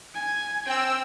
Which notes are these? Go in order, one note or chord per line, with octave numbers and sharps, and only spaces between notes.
G#5
C4 G5 E6